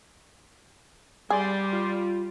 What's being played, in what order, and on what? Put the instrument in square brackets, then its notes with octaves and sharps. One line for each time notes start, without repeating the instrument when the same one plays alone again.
[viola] G3 [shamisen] G#4 [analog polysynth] D5 C6
[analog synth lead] F4